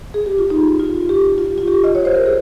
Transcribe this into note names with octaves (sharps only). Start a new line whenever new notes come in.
G#4
G4
F4
D#4
F4
G4
F4
F4
G4
D#5
C#5
C5
A#4
G#4